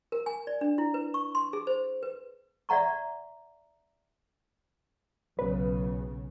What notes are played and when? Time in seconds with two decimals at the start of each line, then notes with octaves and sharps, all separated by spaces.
0.12 A#4
0.26 G#5
0.47 D5
0.61 D4
0.78 E4
0.94 B4
1.14 C#6
1.35 C6
1.53 G#4
1.67 C5
2.03 B4
2.69 D5 E5 F#5 A#5 C#6
5.39 B1 C#3 B4